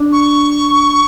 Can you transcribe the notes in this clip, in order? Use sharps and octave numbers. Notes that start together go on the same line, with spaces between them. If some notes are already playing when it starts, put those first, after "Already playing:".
Already playing: D4
C#6